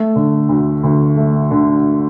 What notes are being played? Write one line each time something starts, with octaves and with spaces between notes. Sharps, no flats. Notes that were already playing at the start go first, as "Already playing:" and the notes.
Already playing: A3
D3
D2
D2
A3
D3